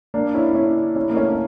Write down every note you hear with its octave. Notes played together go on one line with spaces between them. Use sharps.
A#3 D4
C#4 E4
C#4 E4
C#4 E4
A#3
A3 C#4